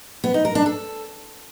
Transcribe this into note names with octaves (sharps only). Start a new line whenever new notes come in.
B3
D#4
A#4
D4
A4